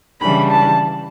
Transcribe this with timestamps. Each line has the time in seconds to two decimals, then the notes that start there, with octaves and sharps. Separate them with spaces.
0.21 C#3 E3 G3 D4 B5
0.51 A5